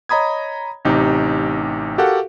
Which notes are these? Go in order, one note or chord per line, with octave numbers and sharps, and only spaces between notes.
C#5 D#5 A#5 B5 D#6 G#6
A1 C3 D#4 G4
F#4 G4 A4 A#4 F5 F#5